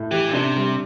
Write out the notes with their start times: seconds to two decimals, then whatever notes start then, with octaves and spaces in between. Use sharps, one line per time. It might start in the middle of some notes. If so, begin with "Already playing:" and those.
Already playing: A2
0.11 E3 G4
0.28 A#2
0.33 C3 D4
0.56 G3